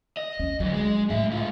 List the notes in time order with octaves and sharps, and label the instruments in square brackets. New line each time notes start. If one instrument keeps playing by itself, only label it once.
[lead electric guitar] D#5
[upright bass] D#2 C#4
[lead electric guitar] F2 D3 [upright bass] F#3
[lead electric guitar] G#3
[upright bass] A2 G#3 [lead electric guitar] D4 E5
[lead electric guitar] G#2 F4